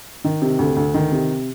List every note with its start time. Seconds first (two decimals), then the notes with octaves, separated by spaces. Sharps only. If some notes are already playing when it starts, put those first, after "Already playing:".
0.24 D#3
0.42 C3
0.59 D2
0.76 D2
0.94 D#3
1.12 C3